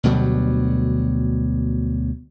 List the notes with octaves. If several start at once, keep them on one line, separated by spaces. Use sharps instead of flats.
D2 B2 F#3 G3